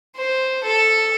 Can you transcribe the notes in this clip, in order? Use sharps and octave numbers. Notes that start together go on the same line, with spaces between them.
C5
A4